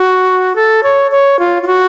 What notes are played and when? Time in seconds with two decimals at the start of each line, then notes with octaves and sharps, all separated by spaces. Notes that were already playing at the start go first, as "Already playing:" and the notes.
Already playing: F#4
0.56 A4
0.83 C#5
1.11 C#5
1.39 F4
1.63 F4
1.67 F#4